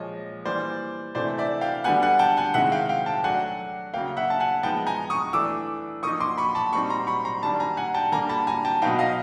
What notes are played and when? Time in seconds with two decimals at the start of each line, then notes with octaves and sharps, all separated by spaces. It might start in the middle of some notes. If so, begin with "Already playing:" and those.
Already playing: A#2 F3 G#3 C#5 D#5
0.45 E3 G3 A#3 C5 D5
1.15 C3 E3 A3 C5 D5
1.38 D5 E5
1.61 F5 G5
1.84 D3 G3 B3 F#5 G#5
2.02 F#5 G#5
2.19 G5 A5
2.37 F#5 G#5
2.54 C3 D#3 G#3 C4 E4 E5 F#5
2.72 F5 G5
2.89 F5 G5
3.06 G5 A5
3.24 F#3 A3 D4 F#5 G#5
3.94 C#3 F#3 A#3 F5 G5
4.17 E5 F#5
4.30 A5
4.40 F#5 G#5
4.63 F3 G#3 B3 D#4 G5 A5
4.86 G#5 A#5
5.10 C#6 D#6
5.33 E3 A3 D4 D6 E6
6.02 F3 A#3 D#4 C#6 D#6
6.20 C6 D6
6.37 B5 C#6
6.55 A5 B5
6.72 A#2 G3 C4 D#4 B5 C#6
6.90 A#5 C6
7.07 B5 C#6
7.25 A#5 C6
7.42 D#3 G3 A#3 D4 A5 B5
7.60 G#5 A#5
7.77 F#5 G#5
7.94 G5 A5
8.12 D3 G3 A#3 G#5 A#5
8.29 A5 B5
8.47 G#5 A#5
8.65 G5 A5
8.82 B2 F#3 B3 D#4 F5 G5
8.99 D#5 F5